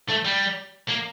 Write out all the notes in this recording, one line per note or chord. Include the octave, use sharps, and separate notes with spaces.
A3
G3
A#3